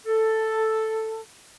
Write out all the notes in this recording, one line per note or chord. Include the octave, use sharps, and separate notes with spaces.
A4